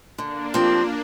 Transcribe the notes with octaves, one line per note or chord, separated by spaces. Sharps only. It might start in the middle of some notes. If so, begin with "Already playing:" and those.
D3 A#3 D4
F3 C4 G4